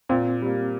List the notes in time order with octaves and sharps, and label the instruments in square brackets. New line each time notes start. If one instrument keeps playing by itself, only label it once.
[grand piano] A#2 [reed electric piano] C4
[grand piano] G3 A#3